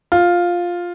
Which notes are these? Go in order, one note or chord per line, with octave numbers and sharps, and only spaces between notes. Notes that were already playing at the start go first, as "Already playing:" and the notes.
F4